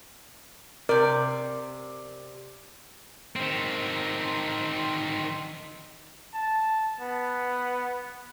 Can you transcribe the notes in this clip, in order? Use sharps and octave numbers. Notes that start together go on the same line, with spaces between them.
C3 A#4 D5
D#3 C4
A5
B3